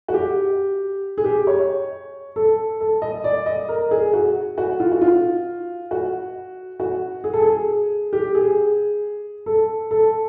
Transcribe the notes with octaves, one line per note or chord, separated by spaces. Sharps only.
F#4
G4
G#4
G4
C#5
A4
A4
D#5
D5
D#5
A#4
G#4
F#4
F#4
F4
F#4
F4
F#4
F#4
G#4
A4
G#4
G4
G#4
A4
A4